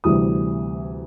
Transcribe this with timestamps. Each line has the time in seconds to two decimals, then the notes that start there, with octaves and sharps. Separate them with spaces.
0.04 D2 C3 E3 G3 D#6